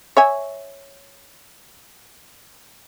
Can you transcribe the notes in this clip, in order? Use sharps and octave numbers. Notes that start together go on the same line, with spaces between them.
C#5 E5 G#5